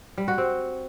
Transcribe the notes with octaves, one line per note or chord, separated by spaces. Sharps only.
G3
F#4
C4